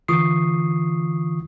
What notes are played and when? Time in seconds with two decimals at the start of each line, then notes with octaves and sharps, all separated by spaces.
0.08 D3 E3 F4 C#6 D#6 C7